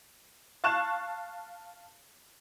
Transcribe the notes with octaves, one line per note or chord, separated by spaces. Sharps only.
F5 A5 C#6 F#6 E7